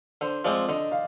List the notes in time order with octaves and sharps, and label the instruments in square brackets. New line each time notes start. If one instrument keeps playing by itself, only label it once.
[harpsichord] D3 [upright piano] C5
[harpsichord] F3 G#3 C4 [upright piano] D5
[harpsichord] D3 [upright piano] D#5
[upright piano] F5